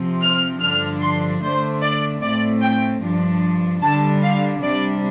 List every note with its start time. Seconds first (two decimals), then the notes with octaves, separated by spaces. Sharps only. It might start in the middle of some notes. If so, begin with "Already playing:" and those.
Already playing: C3 F3 C4
0.23 F6
0.62 G2 D3 F3 D4 F6
1.02 C6
1.42 D3 A3 D4 C5
1.83 D5
2.22 A2 A3 C4 D5
2.62 G5
3.02 G2 F3 D4
3.82 D3 G3 D4 A5
4.23 F5
4.63 C3 G3 D4 D5